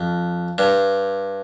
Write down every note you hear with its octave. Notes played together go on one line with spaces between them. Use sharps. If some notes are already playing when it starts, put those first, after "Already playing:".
Already playing: F2
G2